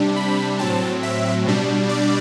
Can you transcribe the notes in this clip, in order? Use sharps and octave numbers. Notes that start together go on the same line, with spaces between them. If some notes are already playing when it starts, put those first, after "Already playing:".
Already playing: C3 G3 D4
B5
A2 F#3 C4 A5
E5
B2 G3 D4
D5